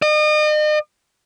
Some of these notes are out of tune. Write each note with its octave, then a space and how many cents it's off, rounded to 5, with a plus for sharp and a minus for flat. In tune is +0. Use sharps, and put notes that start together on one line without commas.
D#5 -40